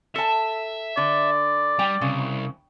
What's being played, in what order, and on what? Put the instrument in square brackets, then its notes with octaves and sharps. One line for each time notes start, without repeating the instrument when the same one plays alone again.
[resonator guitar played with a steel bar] A4 A5 [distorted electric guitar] E5
[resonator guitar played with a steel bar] D3 [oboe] D5
[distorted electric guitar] G3 [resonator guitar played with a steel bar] G5
[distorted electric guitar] C2 [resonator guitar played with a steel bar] C#3